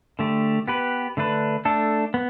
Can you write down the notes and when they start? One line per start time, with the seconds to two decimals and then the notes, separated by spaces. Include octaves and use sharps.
0.19 D3 A3 G4
0.68 B3 G4 B4
1.17 D3 A3 D4 B4
1.65 A3 D4 A4
2.14 B3